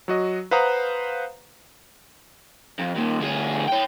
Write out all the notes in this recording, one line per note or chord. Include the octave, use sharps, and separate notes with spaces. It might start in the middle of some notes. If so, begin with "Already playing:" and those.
F#3 F#4 D#5
B4 C5 F5 F#5 A#5 D#6
F2
D#2 A#2
D2 G#4
C#5 G5